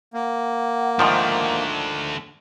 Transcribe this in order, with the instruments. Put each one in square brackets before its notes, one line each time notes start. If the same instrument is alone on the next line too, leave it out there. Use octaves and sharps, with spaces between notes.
[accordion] A#3 [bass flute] F#5
[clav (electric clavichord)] G#2 D#3 F3 [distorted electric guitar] A3 D4